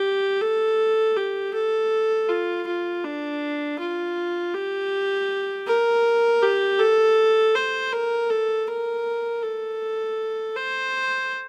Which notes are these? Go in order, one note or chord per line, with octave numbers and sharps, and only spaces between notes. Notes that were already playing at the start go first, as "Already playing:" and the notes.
Already playing: G4
A4
G4
A4
F4
F4
D4
F4
G4
A#4
G4
A4
C5
A#4
A4
A#4
A4
C5